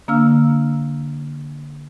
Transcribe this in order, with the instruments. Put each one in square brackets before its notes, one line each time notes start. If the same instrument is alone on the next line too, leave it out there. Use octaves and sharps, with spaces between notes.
[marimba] D3 A#3 D4 F5 E6 F6